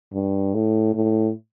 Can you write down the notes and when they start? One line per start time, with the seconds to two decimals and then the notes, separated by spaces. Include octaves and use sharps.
0.14 G2
0.54 A2
0.95 A2